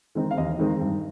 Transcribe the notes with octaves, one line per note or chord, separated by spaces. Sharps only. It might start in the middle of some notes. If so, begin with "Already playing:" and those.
D#3 G#3 C4 D#4
F5
D#2 D#5
D#3 G#3 C4 D#4
G2